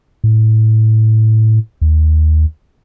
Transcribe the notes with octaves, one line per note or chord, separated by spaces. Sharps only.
A2
D#2